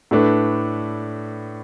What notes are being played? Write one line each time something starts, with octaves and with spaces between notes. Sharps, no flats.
A2 A3 D4 B4